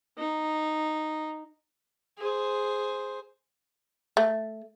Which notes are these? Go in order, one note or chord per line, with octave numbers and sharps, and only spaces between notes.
D#4
G#4 C5
A3